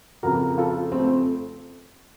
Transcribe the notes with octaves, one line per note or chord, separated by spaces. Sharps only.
F2 C#3 F#4 A#4
F4 A4
A3 C4